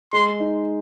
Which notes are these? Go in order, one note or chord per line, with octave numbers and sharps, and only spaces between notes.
G#3 C6
D#4